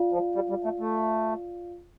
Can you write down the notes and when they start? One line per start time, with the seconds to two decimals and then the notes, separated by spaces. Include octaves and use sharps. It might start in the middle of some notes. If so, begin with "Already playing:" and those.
Already playing: F4 D5 F5
0.12 F3
0.35 G3
0.50 G3
0.64 A3
0.80 A3